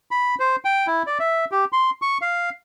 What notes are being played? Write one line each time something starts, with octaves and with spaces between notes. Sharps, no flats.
B5
C5
G5
E4
D5
E5
G4
C6
C#6
F5